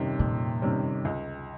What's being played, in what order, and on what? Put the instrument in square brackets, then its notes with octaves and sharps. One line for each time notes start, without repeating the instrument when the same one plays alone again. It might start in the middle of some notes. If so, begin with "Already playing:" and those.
Already playing: [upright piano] F2 C3 D#3 G3 C#4
[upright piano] F2 [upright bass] A#2
[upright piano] C3 D#3 G3 C#4
C#2